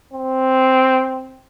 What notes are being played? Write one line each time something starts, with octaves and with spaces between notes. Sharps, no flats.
C4